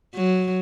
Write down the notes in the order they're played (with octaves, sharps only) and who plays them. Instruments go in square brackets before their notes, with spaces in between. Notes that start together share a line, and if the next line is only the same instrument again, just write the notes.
[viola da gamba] F#3